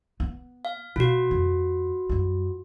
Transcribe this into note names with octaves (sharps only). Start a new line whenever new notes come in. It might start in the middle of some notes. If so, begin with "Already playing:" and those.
B3
F5
B2 F4 F#4
F2
F#2 G3